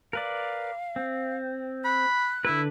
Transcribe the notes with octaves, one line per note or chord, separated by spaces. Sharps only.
A#4 B4 D5 F5
C4
B5 F#6
D3 E4 B4